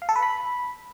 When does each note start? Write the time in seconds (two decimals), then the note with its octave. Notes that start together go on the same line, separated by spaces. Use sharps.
0.02 F5
0.09 A4
0.16 B4
0.23 B5